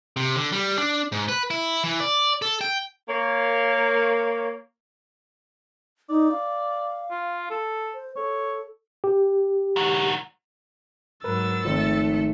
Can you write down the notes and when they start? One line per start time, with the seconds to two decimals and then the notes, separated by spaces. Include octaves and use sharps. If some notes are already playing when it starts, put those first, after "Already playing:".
0.17 C3
0.36 D3
0.52 G3
0.78 D4
1.12 G#2
1.29 B4
1.51 E4
1.84 E3
2.00 D5
2.42 A4
2.61 G5
3.08 A#3 C#5
6.09 D#4 D5
6.32 F5
7.11 F4
7.50 A4
7.94 C5
8.16 A4 C#5
9.04 G4
9.76 D#3 F#4
11.24 G#2 F#3 A#4 B4 E6 A6
11.65 G#1 F3 G#3 A3 C4 A4